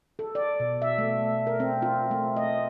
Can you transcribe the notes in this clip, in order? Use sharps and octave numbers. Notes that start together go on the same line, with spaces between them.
A4
D5
B2
E5
A3
A#4
C4
F4
A3
D#5